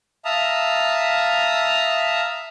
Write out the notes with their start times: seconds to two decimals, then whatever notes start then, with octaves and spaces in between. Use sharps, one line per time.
0.25 E5 F5 A5 A#5 D#6